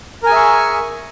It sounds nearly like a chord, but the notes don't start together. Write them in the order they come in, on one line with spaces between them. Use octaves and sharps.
A#4 G#5 G#4 E5 C#6